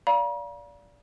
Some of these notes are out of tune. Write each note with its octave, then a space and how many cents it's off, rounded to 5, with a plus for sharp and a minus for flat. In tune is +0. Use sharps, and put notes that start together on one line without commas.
D5 -20 F5 +0 A#5 +45